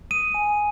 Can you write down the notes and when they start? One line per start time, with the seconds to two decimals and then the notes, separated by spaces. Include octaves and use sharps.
0.11 D#6 D#7
0.34 G#5